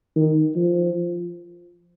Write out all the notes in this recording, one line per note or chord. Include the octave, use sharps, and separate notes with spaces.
D#3
F3